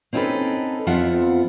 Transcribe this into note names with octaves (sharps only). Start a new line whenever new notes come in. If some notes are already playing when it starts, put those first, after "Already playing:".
C4 C#4 D#4 F4 A4 B4
F2 F3 B3 F4 E5 F#5